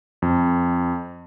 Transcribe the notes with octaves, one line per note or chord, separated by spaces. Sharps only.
F2